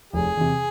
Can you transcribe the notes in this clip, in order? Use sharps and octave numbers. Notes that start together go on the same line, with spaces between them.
F1 G#4
E2 C3